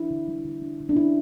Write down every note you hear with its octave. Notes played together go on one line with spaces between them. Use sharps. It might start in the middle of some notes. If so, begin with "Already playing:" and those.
Already playing: D4 E4
D3
G3
D3
D4
D3
D4
C#4 E4